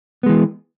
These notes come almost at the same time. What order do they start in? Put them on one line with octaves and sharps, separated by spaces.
B3 G#3 E3